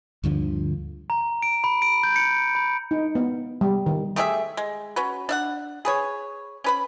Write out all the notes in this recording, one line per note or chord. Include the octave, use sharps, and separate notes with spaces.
D2 G2 D3 F3
A#5
D7
B5
D7
G6
C#7
B5
D#4
B3
G3
D#3
A3 G4 G#4 E5
G#3
C#4 F#4 B4
D4 E5 F#5
G#4 B4 C#5
C#4 B4 B5